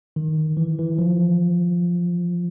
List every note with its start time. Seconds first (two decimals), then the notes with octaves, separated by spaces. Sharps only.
0.16 D#3
0.57 E3
0.79 E3
0.98 F3